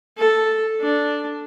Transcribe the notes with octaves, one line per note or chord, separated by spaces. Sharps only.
A4
D4